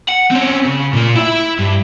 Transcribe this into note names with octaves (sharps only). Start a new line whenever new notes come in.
F#5
C4 C#4
C#3
A#2 A#3
E4 E5
G2